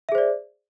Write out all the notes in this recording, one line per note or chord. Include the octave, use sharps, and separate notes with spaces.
G#4 C5 D5 E5